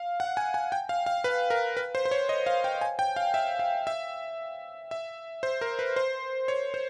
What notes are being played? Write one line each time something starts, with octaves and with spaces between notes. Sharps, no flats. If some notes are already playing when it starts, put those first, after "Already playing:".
Already playing: F5
F#5
G#5
G#5
G5
F5
F5
B4
A#4
B4
C5
C5
C#5
D#5
F5
G5
G#5
G5
F5
E5
F5
E5
E5
C5
A#4
B4
C5
C#5
C5